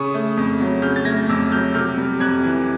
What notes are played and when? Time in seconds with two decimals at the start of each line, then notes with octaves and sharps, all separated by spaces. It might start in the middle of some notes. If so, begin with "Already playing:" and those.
Already playing: C#3 C#6 D#6
0.14 A3
0.37 F2
0.60 F#3
0.82 C#3 F6 G6
0.96 A6
1.05 A3 G#6 A#6
1.29 F2 D6 E6
1.51 F#3 F6 G6
1.74 C3 F6 G6
1.97 G3
2.20 F2 F#6 G#6
2.44 E3